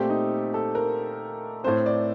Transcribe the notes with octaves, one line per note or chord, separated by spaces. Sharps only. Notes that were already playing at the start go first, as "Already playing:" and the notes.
Already playing: A#2 A3 C4 G4
D#4
A4
A#4
A2 A3 C4 C5
D5